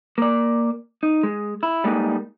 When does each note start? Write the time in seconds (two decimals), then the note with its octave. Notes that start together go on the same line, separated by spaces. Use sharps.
0.18 A#3 D5
1.03 D#4
1.23 G#3
1.63 E4
1.84 G3 G#3 A#3 D#4